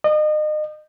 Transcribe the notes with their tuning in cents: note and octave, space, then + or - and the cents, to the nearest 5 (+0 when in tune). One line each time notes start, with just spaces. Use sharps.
D#5 -35